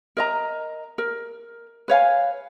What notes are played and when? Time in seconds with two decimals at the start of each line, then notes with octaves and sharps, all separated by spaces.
0.17 A#4 D#5 A#5
0.98 A#4
1.88 B4 C#5 F5 G#5